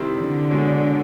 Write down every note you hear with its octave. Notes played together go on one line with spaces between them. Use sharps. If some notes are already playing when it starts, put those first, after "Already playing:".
Already playing: C3 D#3 G3 C4 E4
D3
B2 G#3 C#4